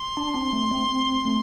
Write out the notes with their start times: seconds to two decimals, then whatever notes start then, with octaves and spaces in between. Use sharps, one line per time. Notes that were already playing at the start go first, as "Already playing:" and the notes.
Already playing: C6
0.17 D4
0.34 C4
0.53 A3
0.71 C4
1.25 A3